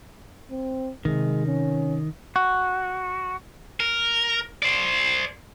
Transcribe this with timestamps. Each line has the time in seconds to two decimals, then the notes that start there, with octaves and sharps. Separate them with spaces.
0.51 C4
1.05 C3 D#3 G#3
1.46 C#4
2.36 F#4
3.80 A#4
4.62 C5 D5